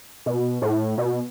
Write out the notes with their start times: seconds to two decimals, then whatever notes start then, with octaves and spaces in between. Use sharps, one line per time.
0.26 B2
0.62 A2
0.98 B2